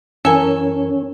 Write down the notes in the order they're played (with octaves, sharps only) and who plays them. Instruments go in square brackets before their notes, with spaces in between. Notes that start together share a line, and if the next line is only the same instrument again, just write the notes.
[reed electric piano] F#2 E3 A#4 [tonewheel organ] C#4 [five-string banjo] A4 G#5